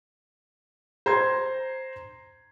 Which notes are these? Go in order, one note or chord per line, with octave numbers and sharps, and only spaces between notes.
C5 A#5 C6 G#6